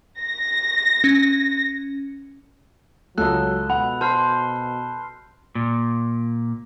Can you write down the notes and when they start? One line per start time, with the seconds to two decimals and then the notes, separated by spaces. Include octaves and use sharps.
0.20 A#6
1.04 C#4
3.18 C#2 F#3 A4 D#5 F#6
3.70 B2 F#5 B5
4.01 C5 A5 F6 C7
5.55 A#2